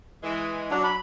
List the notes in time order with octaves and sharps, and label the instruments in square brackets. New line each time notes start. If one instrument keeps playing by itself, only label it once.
[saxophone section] E3 G#3
[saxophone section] F#3 [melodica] D4
[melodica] B5